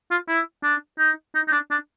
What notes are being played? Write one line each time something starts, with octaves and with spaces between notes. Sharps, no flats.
F4
E4
D4
D#4
D#4
D#4
D4
D4